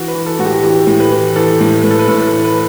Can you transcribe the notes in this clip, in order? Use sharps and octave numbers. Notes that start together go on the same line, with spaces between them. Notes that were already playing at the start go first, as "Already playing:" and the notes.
Already playing: E3 F#4
B4
E3
A4
A2 F#4
G4
E3 G4
A2
B4
E3
E3 A4
A2
A2 B4
A4
B4
A2 A4
A4
E3
B4